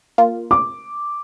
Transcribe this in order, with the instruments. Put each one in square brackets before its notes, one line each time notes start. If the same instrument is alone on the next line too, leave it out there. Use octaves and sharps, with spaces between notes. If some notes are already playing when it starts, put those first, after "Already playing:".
[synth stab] A#3 F4
[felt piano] D6